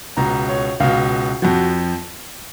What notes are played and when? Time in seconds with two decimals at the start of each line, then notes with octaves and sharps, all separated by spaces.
0.17 C#2 B2 A#5
0.49 C#5
0.80 C#2 B2 F5
1.42 F2 F3 F#4